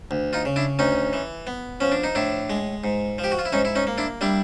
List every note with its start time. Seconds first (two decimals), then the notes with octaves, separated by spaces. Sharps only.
0.11 D2
0.33 D#4 F4
0.45 C#3
0.56 D4 E4
0.79 D2 C#4 D#4
1.13 E3
1.47 B3
1.80 F3 C#4
1.92 D4
2.04 D#4
2.15 A2 D4 E4
2.50 G#3
2.84 G#2
3.18 F3
3.24 G4
3.32 F#4
3.39 F4
3.46 E4
3.53 G#2 C#4 D#4
3.65 E4
3.75 C#4 D#4
3.87 A#3
3.98 D4 E4
4.21 G3 D4 E4